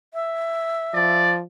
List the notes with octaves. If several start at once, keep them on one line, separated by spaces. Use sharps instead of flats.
E5
F3 D5